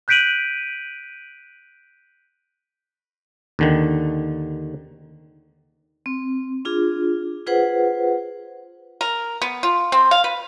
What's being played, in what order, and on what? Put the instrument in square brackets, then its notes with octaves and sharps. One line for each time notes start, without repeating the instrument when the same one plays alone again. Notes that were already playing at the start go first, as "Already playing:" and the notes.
[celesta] F#6 G6 B6 D7 D#7 F#7
[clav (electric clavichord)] D#2 D3 D#3
[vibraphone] C4
D4 F4 G#4
F4 G#4 B4 C5 F#5
[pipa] A#4
B3
F4
C4
F5
B4